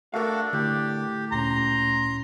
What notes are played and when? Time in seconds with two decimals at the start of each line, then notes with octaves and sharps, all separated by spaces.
0.14 A3 D4 F#4 A4 A#4 F5
0.53 A2 D3 G4
1.32 D2 A#2 C#4 A#5 C6